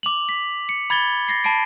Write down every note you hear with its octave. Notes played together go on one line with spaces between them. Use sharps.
D6 F7 F#7
B6
C#7
B5 G#6 A6 G7
A6 A#6 C7
A5 B5 C7 D7